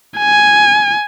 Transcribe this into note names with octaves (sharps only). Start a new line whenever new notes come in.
G#5